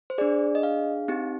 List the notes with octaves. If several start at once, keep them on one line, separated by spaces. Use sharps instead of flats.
C5
D4 G#4 D5
D#5
F5
C4 D#4 G4